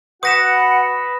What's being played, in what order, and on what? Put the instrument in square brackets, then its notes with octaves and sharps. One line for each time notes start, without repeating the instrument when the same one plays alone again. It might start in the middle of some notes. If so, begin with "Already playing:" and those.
[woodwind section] F#4 F#5 [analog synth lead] B4 [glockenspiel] D#6 A#6 E7